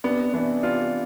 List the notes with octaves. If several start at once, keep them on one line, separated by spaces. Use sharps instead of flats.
C3 B3 D4
E3 B3 D4
C3 D4 F4